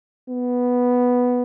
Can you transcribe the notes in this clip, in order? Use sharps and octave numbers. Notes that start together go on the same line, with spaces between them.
B3